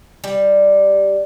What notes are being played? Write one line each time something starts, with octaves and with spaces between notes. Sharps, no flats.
G3